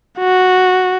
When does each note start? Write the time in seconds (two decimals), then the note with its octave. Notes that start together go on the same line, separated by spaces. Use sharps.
0.19 F#4